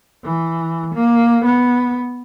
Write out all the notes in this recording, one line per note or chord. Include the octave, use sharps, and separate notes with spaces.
E3
A#3
B3